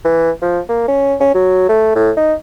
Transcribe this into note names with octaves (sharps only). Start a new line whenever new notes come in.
E3
F3
A#3
C#4
C#4
F#3
A3
A2
D#4